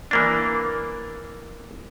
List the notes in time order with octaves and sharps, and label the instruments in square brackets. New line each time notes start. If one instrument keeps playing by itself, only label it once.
[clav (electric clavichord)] E3 A#3 D4